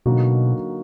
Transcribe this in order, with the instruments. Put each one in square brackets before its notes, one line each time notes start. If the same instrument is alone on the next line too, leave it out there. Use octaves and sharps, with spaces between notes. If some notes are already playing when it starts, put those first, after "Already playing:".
[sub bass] B2 [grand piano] D3 F#3 A#3 D#4 F#4